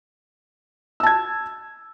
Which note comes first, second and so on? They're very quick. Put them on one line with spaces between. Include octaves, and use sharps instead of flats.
E6 A5 G#6